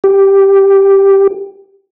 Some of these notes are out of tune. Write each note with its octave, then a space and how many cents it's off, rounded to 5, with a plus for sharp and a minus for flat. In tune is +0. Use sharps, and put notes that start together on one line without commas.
G4 +0